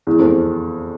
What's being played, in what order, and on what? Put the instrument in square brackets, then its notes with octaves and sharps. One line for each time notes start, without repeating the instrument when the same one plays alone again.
[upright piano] E2
F2